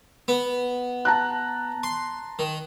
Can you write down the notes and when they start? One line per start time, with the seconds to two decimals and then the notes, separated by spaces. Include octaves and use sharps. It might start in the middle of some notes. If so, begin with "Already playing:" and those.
0.28 B3
1.05 A5 A#5 F#6
1.83 C6
2.39 D#3